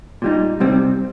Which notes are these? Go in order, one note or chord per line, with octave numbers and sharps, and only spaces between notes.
A#2 G3 D#4
C2 C3 G3 C4